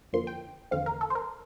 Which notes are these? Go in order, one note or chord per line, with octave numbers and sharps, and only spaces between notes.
F2 D3 F3 A#3 C6
G5
E2 D3 F3 A3 C4 F5
A#4
A4
C5
A#4